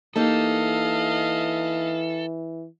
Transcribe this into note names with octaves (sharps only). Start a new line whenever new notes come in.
E3 A#3 D#4 G4 A4 D#5 F5